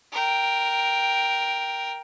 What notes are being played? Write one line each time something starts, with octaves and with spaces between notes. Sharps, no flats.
A#4 G5